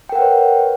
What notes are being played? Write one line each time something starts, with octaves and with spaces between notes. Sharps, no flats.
A#4 B4 C#5 F#5 G5